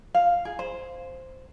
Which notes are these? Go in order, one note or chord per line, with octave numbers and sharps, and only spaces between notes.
F5
G#4
C5